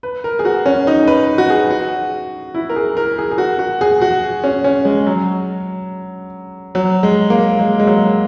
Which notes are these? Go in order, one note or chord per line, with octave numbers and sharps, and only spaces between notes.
B4
A#4
G#4
F#4
C#4
D#4
B4
F#4
G#4
F#4
E4
A#4
G#4
A#4
G#4
G#4
F#4
F#4
G#4
F#4
C#4
C#4
G#3
F#3
F#3
G#3
A#3
G#3
G#3
F#3